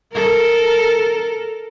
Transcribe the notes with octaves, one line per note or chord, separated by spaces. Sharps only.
A4 A#4